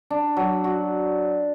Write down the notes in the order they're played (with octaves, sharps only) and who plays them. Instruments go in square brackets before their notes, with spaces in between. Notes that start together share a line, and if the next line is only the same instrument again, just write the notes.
[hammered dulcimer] D4
F#3
F#4